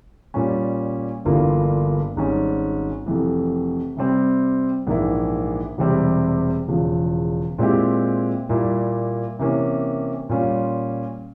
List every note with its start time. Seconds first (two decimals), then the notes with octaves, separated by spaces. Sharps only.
0.34 A#2 G3 C#4
1.25 G1 G2 E3 A#3 F4
2.16 G#1 G#2 G3 C#4
3.06 F1 F2 E3
3.97 C3 G3 C4
4.87 A#1 G#2 E3 A#3 E4
5.78 E1 E2 C3 G3 C4
6.68 E1 E2 C#3 F3
7.58 A#2 G#3 C4 E4 G4
8.49 A#2 G3 A#3 E4
9.39 C3 E3 A#3 C#4
10.29 A#2 G3 C#4 F4